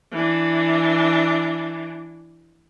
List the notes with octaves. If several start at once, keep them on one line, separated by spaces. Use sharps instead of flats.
E3 D4